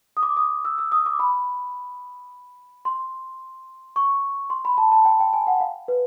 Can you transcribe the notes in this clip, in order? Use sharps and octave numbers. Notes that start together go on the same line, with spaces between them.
D#6
D6
D#6
E6
E6
D#6
D6
B5
C6
C#6
C6
B5
A5
A5
G5
G5
G#5
F#5
F5
B4